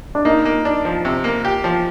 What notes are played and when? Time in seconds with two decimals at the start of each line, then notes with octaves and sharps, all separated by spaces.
0.15 D4
0.25 A#3 D#4
0.45 A#3
0.65 D4
0.85 F3
1.05 C3
1.24 A#3
1.45 G4
1.64 F3